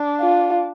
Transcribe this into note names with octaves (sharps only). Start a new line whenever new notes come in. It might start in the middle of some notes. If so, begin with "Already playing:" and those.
Already playing: D4
F4